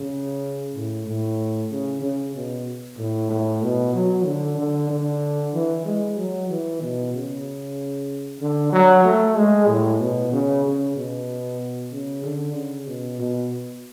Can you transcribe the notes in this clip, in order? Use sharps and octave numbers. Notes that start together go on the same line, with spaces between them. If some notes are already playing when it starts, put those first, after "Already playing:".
Already playing: C#3
A2
A2
C#3
C#3
B2
A2
A2
B2
F#3
D3
D3
D3
E3
G#3
F#3
E3
B2
C#3
D3
F#3
A3
G#3
A2
B2
C#3
C#3
B2
C#3
D3
C#3
B2
B2